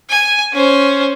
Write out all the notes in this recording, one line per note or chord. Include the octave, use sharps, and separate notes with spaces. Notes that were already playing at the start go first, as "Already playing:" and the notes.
G#5
C#4 C5